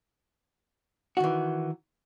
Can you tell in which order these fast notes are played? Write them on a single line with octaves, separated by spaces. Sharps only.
F#4 D#3 E3